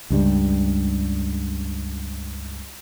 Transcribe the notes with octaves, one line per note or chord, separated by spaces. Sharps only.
C#2 G2 G3